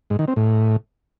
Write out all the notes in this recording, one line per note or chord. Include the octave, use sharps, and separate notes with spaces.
G#2
D#3
C4
A2